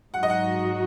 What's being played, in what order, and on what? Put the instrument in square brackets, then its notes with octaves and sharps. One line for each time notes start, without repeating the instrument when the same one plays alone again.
[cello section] G#2 F#3 D#4 F#4 [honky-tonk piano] F#5
[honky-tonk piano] D#5
F#5